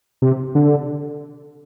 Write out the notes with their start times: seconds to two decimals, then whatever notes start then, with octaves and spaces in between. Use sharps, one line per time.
0.22 C3
0.55 D3